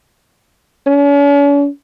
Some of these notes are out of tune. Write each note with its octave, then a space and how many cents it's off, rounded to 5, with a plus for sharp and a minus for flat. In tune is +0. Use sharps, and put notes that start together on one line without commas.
C#4 +45